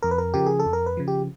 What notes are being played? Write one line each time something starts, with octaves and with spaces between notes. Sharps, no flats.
F2 A#4
B4
A#4
C#3 F3 G4
G#4
A4
F2
A#4
B4
C#3 F3
G4